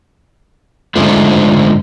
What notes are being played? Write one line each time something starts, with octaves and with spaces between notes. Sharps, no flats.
G#2 D3 F3 A3